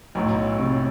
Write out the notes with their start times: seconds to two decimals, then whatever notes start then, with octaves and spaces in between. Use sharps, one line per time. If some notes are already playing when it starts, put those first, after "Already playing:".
0.15 B1 A2 F#3
0.59 C3